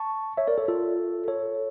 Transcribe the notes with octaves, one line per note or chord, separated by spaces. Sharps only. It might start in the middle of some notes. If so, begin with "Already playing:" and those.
Already playing: A5 C#6
C#5 E5
A#4 D5
A4 C#5
F4 A4
A4 C#5